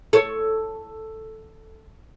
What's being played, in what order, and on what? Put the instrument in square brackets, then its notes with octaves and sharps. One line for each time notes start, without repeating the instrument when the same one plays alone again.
[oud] A4 C#5